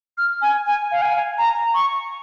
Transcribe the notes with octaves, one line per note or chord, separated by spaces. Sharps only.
F6
G#5
G#5
F5
G#5
A#5
C#6